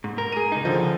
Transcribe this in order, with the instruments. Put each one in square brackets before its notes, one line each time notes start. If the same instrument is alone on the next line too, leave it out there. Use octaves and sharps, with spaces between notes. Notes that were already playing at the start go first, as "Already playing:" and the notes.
[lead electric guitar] G#2
A#4
[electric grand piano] G#4 D#7
[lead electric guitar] C#2 D#4
[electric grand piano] D3 F3